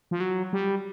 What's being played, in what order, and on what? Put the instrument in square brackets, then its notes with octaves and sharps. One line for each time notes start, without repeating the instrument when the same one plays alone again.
[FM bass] F3
F#3
G3